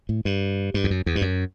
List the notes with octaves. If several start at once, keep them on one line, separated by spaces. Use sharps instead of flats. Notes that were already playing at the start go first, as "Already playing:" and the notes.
A2
G2
G2
E2
F#2
E2
G2
F#2